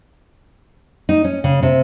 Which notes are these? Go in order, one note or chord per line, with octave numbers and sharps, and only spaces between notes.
D#4
C#4
C#3
C3